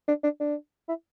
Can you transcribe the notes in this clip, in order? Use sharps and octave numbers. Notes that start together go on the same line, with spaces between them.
D4
D4
D4
E4